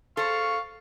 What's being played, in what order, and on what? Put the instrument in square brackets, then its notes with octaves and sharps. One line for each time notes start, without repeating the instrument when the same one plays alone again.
[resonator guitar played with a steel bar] A4 C5 [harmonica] F5 C#6